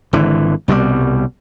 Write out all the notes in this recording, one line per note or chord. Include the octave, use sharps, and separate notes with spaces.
G#1 D3 E3
C2 B2 E3 G3